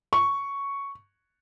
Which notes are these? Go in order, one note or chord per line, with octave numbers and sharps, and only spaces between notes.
C#6